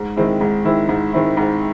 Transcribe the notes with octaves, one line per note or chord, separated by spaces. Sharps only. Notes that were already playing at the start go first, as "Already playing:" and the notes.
Already playing: G#2
D#3 G#3 C4 E4
G#2
D#3 G#3 C4 E4
G#2
D#3 G#3 C4 E4
G#2